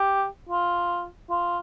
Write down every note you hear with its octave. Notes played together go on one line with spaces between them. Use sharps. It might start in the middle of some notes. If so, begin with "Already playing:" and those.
Already playing: G4
F4
F4